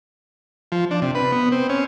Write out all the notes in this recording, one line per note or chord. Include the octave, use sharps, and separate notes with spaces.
F3
D4
C3
B4
B3
C4
C#4